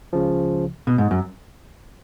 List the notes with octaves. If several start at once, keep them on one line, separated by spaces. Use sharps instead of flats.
C#2 C#3 F3
B2
G#2
F#2